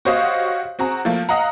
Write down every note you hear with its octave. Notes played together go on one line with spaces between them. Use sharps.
F#4 G4 C5 C#5 D#5 F5
C4 F#4 G#4 A#5
F3 A3 A#3
D#5 F5 F#5 A#5